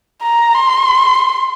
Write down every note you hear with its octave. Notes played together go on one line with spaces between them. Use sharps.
A#5
C6